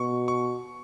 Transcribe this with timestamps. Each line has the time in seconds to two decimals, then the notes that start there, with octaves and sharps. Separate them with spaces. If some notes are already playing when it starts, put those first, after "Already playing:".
Already playing: B2 C#6
0.28 C#6